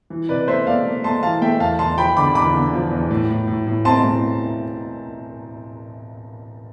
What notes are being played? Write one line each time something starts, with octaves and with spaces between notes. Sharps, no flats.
E3
C3 B4 D5
A3 C5 E5
A3 D5 F5
A3
A3 A5 C6
E3 F5 A5
A3 E5 G5
E2 F5 A5
E2 A5 C6
F3 G5 B5
D3 B5 D6
E2 B5 D6
D3
F3
E2
A2
A2
A2
A2
C4 A5 C6
A2